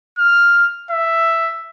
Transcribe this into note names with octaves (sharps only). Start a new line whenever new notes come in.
F6
E5